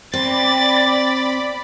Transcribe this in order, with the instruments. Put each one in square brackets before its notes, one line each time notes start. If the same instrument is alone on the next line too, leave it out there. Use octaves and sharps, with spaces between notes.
[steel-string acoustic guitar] C4 [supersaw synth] D5 B5 [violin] A6